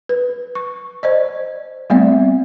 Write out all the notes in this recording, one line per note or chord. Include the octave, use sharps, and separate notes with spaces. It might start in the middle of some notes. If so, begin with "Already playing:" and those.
B4
C#6
C5 D5 D#5
G3 A3 B3 C4 D5 E5